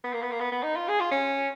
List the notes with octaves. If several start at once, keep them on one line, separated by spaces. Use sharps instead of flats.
B3
A#3
B3
A#3
B3
B3
D#4
F4
G#4
F4
C#4